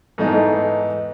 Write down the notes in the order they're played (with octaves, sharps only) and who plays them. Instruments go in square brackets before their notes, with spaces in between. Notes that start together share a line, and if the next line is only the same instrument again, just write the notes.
[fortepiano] G#2 E3 A3 B3 D#4